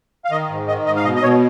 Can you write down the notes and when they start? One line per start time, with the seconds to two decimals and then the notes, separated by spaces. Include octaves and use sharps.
0.25 F5
0.31 D#3 D#5
0.49 G#2
0.67 D#3 D#5
0.86 G#2 D#5
0.96 F5
1.04 B2 D#5
1.16 D#5
1.22 B2 C#5